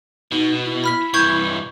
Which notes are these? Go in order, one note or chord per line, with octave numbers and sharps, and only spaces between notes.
B2 D#4
E4
B5 F6 B6
C2 E3 C#6 G6 G#6